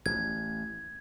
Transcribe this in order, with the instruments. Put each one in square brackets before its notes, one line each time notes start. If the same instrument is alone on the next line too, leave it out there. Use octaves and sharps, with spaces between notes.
[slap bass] A1 [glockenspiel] G#6